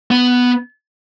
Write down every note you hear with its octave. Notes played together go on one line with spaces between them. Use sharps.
B3